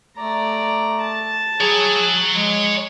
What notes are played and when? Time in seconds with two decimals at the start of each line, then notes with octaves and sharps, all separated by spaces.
0.17 A3 D5 A#5
1.02 A5
1.60 G#4 C#5 A#5
2.34 G#3